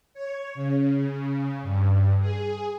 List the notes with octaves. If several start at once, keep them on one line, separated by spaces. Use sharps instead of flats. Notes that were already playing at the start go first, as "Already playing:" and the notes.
C#5
C#3
G2
G#4